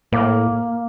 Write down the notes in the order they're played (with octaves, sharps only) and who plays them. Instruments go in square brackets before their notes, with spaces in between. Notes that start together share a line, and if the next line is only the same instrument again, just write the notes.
[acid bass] A2 [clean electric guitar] A#3